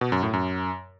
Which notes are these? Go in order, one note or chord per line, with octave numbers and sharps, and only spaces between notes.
B2
F#2
A2
F#2